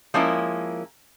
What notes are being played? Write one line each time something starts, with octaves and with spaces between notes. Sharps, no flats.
F3 G#3 A#3 C#4 E4 A#4